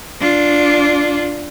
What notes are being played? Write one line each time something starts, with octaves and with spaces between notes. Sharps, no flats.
D4 F4